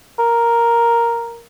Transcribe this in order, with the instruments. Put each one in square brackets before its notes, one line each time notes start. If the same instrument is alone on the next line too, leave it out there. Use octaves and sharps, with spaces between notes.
[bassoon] A#4